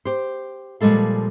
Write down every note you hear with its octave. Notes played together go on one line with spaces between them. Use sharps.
G4 C5
A#2 F3 G3 G#3 A4 F5